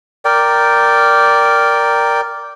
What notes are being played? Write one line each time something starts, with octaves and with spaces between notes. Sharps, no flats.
A#4 D5 G5